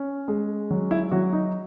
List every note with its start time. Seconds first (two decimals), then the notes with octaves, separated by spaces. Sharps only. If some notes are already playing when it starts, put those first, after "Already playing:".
Already playing: C#4
0.28 G#3
0.71 F#3
0.91 E4
1.11 F#3 F#4
1.33 D#4